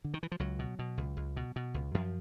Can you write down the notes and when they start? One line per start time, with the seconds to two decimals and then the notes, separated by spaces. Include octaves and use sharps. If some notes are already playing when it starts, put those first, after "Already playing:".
0.04 D3
0.14 D#3
0.23 E3
0.32 F3
0.40 C#2 F#3
0.59 B2
0.79 B2
0.97 C#2
1.17 C#2
1.36 B2
1.56 B2
1.74 C#2
1.94 F#2 F3